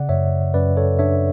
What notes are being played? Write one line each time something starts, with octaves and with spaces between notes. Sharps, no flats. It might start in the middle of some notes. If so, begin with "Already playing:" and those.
Already playing: C#3 D5 F#5
F#2 C#5 E5
F#2 B4 D5
A4 C#5
D4 C#5 E5